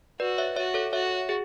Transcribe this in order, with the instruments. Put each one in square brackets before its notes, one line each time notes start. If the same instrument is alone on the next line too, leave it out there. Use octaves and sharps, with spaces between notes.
[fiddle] F#4 [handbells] B4 D5
[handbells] C#5 E5
[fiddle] F#4 [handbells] C#5 E5
[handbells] A4 C#5
[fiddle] F#4 [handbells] C#5 E5
[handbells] G#4